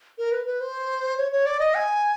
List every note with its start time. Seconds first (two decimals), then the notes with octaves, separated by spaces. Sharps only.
0.18 A#4
0.32 B4
0.46 B4
0.61 C5
1.17 C#5
1.32 C#5
1.46 D5
1.60 D#5
1.75 G#5